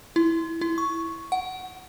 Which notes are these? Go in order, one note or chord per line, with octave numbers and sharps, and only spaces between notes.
E4
E4
C#6
F#5